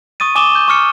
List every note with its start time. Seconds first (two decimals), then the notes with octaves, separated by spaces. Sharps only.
0.20 C#6 D#6 A6 D#7
0.35 G#5 D6 D#6 E7 G7
0.55 G6
0.68 C#6 D6 F6 C#7